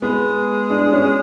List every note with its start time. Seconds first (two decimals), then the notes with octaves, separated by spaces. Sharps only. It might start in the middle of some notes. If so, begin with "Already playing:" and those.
0.02 G#3 B3
0.70 D4
0.93 C#4